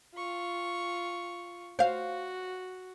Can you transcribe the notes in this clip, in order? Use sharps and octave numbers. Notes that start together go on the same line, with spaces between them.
F4 C#6
F#4 C5 F5